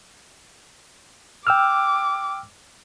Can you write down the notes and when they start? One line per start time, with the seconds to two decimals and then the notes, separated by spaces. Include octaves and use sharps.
1.47 G5 D6 E6 F6